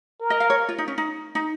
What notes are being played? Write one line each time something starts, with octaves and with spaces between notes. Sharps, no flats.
A#4
D#5
F5
C#5
F4
D#4
C#4
D#4
D#4